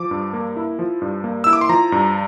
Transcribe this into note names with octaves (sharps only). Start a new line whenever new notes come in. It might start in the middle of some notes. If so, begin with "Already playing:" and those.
Already playing: F3 D6
G2
A#3
E4
F3
G2
A#3
E4 E6
D6
C6
F3 A#5
G2